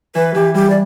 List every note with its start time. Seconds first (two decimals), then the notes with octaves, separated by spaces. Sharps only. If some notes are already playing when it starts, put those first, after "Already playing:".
0.15 E3 B4
0.34 E3 G4
0.54 G3 G4
0.70 D5